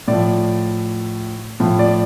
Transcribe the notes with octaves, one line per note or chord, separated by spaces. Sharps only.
A2 F3 D5
A2 F3
D5